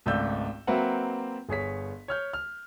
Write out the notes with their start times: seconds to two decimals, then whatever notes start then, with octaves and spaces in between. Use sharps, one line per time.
0.06 G#1 C#2 A3 D5 E6 G6
0.67 F#3 A#3 C4 B4 E5 F#5
1.49 G1 G#4 C#5 B6
2.08 C#5 F6 G6
2.33 F6